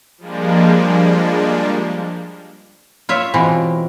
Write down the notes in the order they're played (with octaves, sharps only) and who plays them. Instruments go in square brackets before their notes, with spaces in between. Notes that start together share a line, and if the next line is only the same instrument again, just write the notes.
[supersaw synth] F3 G3 G#3 A#3 D4
[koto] F4 C#5 E5
[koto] B2 E3 G#3 [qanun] C4 F4